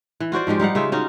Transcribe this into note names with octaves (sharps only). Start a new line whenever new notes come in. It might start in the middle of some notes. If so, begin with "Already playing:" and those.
E3
F4 F#4 C5 D5
G#2 F3 G#3 G4
G3 D#4 F5 F#5
C#3 G#3 F4 E5
C#4 D#4 F4 F#4